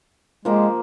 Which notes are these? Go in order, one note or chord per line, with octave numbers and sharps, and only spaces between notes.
F3 G#3 A#3 G4